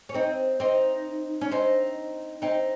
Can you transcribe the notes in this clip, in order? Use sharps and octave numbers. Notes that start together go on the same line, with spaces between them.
C#4
C4 D#4
C4 D#4
C#4
C4 D#4
C4 D#4